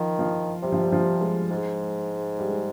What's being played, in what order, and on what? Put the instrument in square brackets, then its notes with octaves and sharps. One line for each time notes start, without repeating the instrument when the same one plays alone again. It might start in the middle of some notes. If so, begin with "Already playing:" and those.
Already playing: [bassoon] D#3 [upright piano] F3
[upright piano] F3
[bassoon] C3 [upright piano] G3
[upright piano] F3
G3
F3
G#3
[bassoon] G#2
[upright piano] G3
G#3